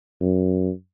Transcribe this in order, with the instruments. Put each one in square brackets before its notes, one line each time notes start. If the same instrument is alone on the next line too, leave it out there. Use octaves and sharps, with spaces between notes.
[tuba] F#2